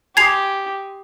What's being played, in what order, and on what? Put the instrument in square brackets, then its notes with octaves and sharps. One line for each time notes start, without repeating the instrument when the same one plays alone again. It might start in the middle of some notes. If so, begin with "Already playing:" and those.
[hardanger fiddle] G4 [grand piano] G#5 C6 D#6 [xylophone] G#6 C7 F7